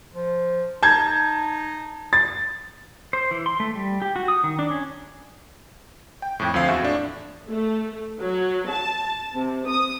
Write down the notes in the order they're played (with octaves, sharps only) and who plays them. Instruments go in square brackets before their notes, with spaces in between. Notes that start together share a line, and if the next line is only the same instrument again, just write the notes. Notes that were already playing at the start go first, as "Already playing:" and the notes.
[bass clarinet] F3
[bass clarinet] D#4 [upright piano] A5 G6 G#6
[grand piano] A6
[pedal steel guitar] C5
E3
C6
A3
G3
G4
F#4
D#6
D#3
D4
C#4
[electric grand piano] G5
F2 A2
D2 F3 C4 F5 C7
E2 F#4 E5
A2 D4
[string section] A3
F#3
A5
C3
D#6